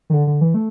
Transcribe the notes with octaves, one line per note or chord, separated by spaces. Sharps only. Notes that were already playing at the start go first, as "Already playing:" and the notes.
D#3
D3
D3
E3
A3